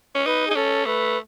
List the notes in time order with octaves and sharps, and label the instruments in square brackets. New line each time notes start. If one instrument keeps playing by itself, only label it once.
[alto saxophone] C#4
[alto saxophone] D#4 [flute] B4
[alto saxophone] D#4 [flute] G#4
[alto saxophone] C#4 [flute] A4
[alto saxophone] A3 [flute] B4